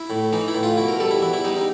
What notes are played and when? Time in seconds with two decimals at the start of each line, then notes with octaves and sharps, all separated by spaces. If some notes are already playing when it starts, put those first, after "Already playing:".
Already playing: E4
0.10 A2
0.32 E3 D#4
0.48 E4
0.55 A2
0.63 F4
0.77 B2 E4
0.88 A#4
1.00 G3 A4
1.11 E4
1.22 E2 E4
1.33 E4
1.44 G3 D#4
1.57 D#4